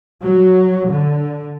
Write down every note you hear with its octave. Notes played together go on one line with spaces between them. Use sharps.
F#3
D3